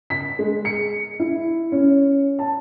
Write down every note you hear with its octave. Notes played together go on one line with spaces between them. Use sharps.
B6
G#3
C#7
E4
C#4
A5